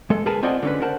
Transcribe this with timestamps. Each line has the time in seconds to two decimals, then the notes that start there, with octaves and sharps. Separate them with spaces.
0.10 G#3 A4
0.26 G#4 A#4 B4 G#5 A5
0.43 C4 F4 D5 D#5 F#5 G#5
0.63 D3 C#4 B4
0.82 A#4 C5 F#5 A5